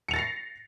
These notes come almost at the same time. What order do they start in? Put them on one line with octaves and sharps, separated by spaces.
C#7 F7 A6 A#6 C7